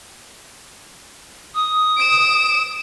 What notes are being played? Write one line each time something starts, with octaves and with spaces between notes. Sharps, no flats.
D#6
D7 E7